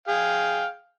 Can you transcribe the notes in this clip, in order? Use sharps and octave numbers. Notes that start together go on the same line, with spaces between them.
G#4 F5 G5